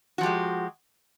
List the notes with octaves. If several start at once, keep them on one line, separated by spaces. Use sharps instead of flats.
F3 G#3 F#4 G4